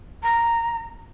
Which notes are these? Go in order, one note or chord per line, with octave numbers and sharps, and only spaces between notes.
A#5